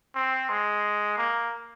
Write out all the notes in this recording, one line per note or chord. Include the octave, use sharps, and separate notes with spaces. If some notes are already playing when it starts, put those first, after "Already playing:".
C4
G#3
A#3